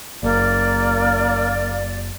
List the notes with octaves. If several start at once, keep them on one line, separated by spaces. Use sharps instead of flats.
F#1 A#3 D5